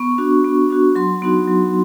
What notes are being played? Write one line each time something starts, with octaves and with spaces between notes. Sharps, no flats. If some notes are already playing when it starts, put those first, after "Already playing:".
Already playing: B3 C#6
D4 F#4
B3
D4 F#4
F#3 C6
B3 D#4 F#4
F#3